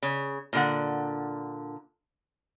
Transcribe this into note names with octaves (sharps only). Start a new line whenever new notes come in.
C#3
A#2 D3 F#5